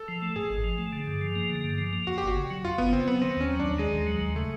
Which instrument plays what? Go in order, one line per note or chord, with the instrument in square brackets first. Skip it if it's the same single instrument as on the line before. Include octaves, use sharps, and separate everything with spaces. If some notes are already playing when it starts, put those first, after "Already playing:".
Already playing: [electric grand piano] A4
[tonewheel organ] F3
A3
[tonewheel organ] G#2 [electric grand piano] G#4
[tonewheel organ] G#1
F3
A3
D3
G2
F3
A#3
D3
G2
F3
A#3
[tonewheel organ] F2 [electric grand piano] F#4
[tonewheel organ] G1 [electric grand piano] G4
[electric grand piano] F#4
[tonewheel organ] C#3
F#3
[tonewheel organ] F2 [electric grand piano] F4
[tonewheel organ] G1 [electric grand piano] B3
[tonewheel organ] C#3 [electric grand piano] C4
[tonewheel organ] F#3 [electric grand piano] B3
[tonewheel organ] D#3 [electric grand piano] C4
[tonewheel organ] D#2 [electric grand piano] C#4
[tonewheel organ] F#3
[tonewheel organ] D#2 [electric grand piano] D4
[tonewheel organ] D#3 [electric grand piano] G#3
[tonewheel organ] D#2
F#3
D#2
[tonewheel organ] C#3 [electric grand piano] A3